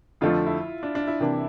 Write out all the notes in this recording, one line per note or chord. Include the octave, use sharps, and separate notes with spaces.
F2 D3 F3 A3 F4
E4
D4
D4
E4
C3 E3 A#3 D4